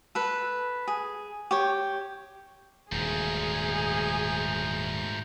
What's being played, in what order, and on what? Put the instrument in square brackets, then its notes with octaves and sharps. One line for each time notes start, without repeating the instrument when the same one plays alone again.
[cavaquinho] A4 B4
G#4
G4 C#5
[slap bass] D#1 [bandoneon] D2 A#5 G6 [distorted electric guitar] G#2 F3 [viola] G#4